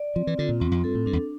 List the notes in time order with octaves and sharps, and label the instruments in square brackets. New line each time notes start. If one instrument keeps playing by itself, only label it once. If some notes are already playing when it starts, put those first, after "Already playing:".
Already playing: [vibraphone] D5
[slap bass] F3 [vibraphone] C4
[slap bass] E3
[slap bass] D3 [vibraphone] F4
[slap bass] A#2
[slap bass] E2 [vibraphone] C4
[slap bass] F2
[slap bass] G2 [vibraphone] A4
[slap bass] A2
[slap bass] G2 [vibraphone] D4
[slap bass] E2